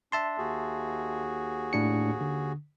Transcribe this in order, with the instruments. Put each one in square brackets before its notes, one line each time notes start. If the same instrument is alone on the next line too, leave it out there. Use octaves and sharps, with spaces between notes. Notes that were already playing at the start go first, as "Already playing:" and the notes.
[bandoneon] D4 [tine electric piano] E5 A5 C6
[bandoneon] D#2 F#4 G#4
[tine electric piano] A2 D4 C#7
D3